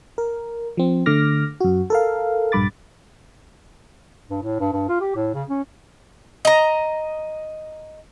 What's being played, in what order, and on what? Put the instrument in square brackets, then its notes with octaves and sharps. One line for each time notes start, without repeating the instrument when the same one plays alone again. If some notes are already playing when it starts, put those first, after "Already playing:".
[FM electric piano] A#4
F3 C4
D3 A3 D6 F6 A#6
F#2 F#4
A4 A#4 F5
A#1 G2 B5 D6 A6
[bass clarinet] G2
A2
G2
G2
F4
G4
A2
C#3
C#4
[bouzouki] D#5 A#5